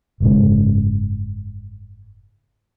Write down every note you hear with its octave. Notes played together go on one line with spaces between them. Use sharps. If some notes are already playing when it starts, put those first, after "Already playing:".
F#1 G#2 C#3